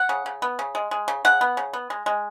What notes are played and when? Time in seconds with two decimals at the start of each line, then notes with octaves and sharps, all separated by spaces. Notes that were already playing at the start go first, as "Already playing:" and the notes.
Already playing: F#5
0.09 C#3
0.26 C#3
0.42 B3
0.59 C#3
0.75 G#3
0.91 G#3
1.08 C#3
1.25 C#3 F#5
1.41 B3
1.57 C#3
1.73 B3
1.90 G#3
2.06 G#3